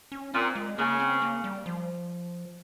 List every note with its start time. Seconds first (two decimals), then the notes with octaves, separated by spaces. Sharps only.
0.12 C#4
0.33 A#2 C4
0.55 G#3
0.78 C#3 A#3
1.00 C4
1.22 A#3
1.44 G3
1.66 F3